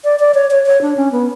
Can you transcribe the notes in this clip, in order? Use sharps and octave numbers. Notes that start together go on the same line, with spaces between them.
D5
D5
C#5
C#5
C#5
D4
C#4
B3